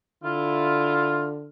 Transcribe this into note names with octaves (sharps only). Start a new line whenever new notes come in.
D3 E4 F4